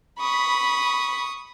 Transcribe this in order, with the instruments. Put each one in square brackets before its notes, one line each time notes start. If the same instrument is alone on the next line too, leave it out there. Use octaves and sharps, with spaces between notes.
[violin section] B5 [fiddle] C#6 D#6